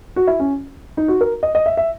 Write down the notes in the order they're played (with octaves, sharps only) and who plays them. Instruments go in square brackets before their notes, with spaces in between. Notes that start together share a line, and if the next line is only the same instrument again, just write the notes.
[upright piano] F#4
E4
C#4
D#4
F#4
A#4
D#5
D#5
E5
E5